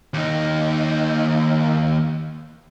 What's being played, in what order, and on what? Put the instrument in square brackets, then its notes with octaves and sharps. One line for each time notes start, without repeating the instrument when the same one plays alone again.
[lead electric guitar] D#2 D#4